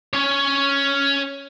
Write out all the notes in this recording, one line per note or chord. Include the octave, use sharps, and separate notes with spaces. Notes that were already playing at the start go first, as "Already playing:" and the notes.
C#4 C#5